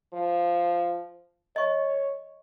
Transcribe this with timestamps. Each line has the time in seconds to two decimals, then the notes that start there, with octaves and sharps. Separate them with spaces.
0.13 F3
1.56 C#5 D#5 C#6